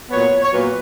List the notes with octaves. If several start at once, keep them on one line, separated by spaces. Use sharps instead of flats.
A#2 F#3 B3 C#5
C#5
A#2 F#3 B3 B4